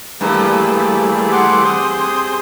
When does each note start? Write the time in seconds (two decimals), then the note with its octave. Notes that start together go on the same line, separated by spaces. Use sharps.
0.21 G2 E3 G3 A3 A#3 G#4
1.32 F#5 C6 D6
1.65 C4 C5 D#6